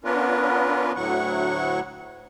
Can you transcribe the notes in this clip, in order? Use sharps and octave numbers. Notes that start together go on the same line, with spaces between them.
B3 C#4 D4 F4 A#4 B4
D2 A2 F#3 F#5 C#6